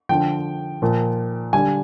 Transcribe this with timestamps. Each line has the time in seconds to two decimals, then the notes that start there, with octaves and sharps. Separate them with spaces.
0.09 D3 F3 G5
0.82 A#2 F3
1.53 D3 G3 G#5